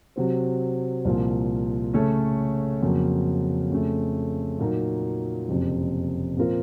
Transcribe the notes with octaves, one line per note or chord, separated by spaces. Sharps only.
C3 F#3 C4
C2 A#2 F3
C#3 A3 C#4 A4 C#5
F2 C#3 F#3 A#3
F2 C#3 A3
A#2 F#3 A#3 D#4
F#1 F2 C3
A#2 F3 C4 F4 A#4